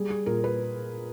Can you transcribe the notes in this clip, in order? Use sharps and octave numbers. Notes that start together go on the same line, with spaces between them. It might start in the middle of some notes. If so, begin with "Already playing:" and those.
Already playing: G3 G#4
G#4
A#2 A#4
B4